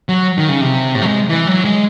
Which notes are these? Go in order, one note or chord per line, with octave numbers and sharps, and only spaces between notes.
F#3
D#3
C#3
C3
A2
F#3
G#3
E3
F#3
G#3